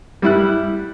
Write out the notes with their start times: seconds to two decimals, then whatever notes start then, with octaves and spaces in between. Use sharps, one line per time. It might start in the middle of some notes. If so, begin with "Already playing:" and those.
0.22 G3 E4 F#6